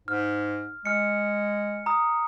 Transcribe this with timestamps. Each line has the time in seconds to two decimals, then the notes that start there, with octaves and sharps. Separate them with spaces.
0.08 G#2 F6
0.85 G#3 F6 C#7
1.86 A#5 D#6